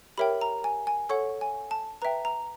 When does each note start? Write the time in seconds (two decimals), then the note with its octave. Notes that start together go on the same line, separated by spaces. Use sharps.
0.18 G4 A#4 C#5 E5 G5 B5
0.41 A#5
0.64 G#5
0.87 G#5
1.09 A4 C#5 F#5 C#6
1.41 G#5
1.71 A5
2.02 B4 E5 G5 A#5
2.25 A#5